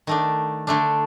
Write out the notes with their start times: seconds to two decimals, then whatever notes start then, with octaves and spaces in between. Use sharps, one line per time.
0.07 D#3 A3 D4
0.67 D3 A3 D4